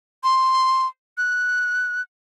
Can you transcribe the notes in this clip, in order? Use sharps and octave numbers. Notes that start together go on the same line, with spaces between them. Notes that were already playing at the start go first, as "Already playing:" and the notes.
C6
F#6